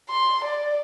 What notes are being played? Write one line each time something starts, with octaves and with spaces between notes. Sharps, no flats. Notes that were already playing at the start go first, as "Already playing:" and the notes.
C6
D5